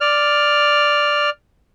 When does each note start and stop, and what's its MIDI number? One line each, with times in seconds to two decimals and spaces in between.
0.01 1.30 74
0.01 1.30 89